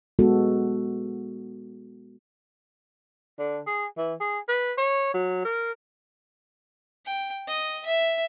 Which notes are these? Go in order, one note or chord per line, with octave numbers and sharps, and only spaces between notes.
G#3 B3 F#4 A4
D3
G#4
E3
G#4
B4
C#5
F#3
A#4
G5
D#5
E5